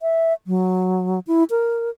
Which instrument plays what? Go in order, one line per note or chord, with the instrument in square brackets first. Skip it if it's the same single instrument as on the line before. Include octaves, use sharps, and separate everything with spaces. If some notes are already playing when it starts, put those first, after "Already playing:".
[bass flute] E5
F#3
E4
A#4